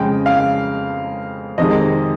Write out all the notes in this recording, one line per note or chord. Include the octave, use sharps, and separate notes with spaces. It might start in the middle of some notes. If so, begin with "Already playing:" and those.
Already playing: F2 C#3 G#3 G5
F5
F2 C3 D#3 G#3 D#5